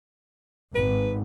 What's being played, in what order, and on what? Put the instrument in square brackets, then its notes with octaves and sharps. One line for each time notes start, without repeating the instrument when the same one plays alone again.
[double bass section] G#1 [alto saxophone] B4